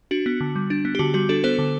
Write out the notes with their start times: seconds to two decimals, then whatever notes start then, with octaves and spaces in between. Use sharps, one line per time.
0.11 D4 F#4
0.26 B3
0.41 D3
0.56 G3
0.70 D4
0.85 B3
0.95 G4
0.99 D3 F#4
1.14 G3 F#4
1.29 D4 F#4 A4
1.44 B3 A4 C5
1.59 D3